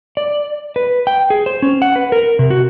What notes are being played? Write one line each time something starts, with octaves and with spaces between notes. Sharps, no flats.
D5
B4
G5
G#4
C5
C#4
F#5
B4
A#4
C3
F#4